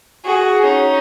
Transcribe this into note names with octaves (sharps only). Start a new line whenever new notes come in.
F#4 G#4
C#4 D#4